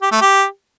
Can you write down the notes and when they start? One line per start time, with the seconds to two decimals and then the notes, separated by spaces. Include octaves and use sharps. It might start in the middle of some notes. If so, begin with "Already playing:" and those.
0.02 G4
0.12 A3
0.21 G4